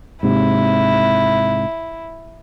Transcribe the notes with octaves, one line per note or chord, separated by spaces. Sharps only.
G#2 C3 E4